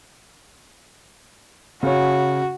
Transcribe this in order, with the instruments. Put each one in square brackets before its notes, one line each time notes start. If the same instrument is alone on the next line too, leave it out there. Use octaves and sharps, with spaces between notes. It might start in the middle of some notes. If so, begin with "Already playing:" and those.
[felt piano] C#3 C#5 [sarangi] F#4